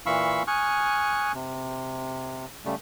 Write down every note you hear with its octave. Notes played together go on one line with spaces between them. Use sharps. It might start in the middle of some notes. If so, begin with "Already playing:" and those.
A#2 E3 F5 B5 C#6 E6
G#5 C#6 D#6 F6 F#6
C3
C#3 G3 A3